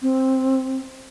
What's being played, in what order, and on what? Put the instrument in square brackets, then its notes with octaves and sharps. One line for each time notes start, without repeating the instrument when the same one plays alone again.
[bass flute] C4